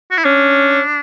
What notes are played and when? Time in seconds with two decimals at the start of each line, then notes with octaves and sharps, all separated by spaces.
0.11 F#4
0.18 E4
0.25 C#4 D4